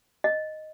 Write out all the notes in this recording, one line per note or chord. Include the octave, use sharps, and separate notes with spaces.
D#5